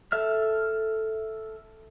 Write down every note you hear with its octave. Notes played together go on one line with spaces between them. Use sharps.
A4 E5 F6